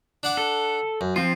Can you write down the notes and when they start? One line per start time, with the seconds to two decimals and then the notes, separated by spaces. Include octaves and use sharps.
0.23 D4 F#5 D6
0.37 A4
1.01 F#2
1.16 F3 C4 F4